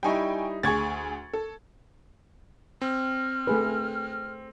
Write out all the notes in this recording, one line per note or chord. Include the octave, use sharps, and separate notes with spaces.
G3 D#4 E4 G5 G#5 C#6
D2 G#4 C#6 G#6 A6
A4
C4 F6
A3 G#4 B4